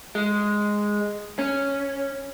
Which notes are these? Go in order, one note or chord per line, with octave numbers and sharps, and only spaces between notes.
G#3
C#4